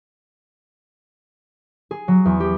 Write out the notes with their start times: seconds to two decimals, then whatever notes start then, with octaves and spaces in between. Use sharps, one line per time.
1.91 G#4
2.08 F#3
2.25 E2
2.40 G4